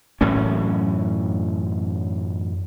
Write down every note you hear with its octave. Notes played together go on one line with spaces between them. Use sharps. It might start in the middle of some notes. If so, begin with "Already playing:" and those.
F#2 A2 E3 C#4